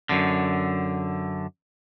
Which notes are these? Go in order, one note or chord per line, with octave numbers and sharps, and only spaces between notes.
F#2 D3